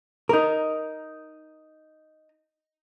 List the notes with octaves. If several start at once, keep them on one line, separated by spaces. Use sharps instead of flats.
D#4 A#4